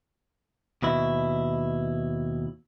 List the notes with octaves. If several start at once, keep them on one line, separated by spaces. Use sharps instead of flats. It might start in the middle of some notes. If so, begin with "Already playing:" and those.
D#2 B2 E4